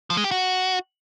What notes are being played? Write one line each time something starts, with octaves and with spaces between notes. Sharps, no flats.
F3
G#3
G4
F#4